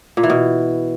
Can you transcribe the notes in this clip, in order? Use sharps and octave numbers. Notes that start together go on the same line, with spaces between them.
A#2
E3
B2